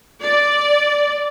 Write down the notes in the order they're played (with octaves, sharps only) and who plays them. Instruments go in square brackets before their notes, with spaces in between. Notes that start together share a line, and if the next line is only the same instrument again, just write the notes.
[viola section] D5